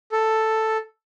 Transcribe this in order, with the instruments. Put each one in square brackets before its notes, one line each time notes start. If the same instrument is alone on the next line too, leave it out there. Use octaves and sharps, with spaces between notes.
[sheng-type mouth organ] A4